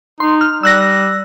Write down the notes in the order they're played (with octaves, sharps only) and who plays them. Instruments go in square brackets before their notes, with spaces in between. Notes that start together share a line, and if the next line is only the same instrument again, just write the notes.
[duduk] D#4 [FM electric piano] C6
[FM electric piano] F6
[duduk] G3 [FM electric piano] E6 F#6 A#6